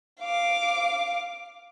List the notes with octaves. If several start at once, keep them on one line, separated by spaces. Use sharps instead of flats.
F5 D6